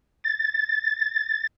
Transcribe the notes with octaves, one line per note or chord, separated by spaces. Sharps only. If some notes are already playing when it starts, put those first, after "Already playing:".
A6